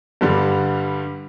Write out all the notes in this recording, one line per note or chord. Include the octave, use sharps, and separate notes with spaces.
G2 D3 G3